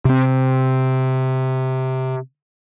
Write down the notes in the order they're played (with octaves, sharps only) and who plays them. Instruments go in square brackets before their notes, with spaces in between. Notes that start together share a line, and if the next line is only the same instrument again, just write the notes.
[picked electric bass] C3 C4